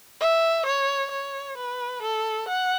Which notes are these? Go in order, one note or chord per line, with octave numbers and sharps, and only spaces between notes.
E5
C#5
C#5
B4
A4
F#5